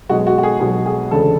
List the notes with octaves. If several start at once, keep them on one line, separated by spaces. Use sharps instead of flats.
B1 B2 G#3 F#4
F#4
F#4
G#4
B1 B2 G#3 G#4
G#4
E1 D2 C#3 A4